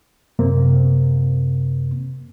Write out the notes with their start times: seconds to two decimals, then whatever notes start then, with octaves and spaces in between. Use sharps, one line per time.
0.39 F#2 C3 A#3 C4